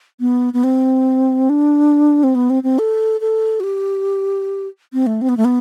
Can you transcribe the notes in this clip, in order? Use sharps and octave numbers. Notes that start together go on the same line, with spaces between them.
B3
B3
C4
D4
C4
B3
C4
C4
A4
A4
F#4
G4
C4
A3
C4
B3
A3
B3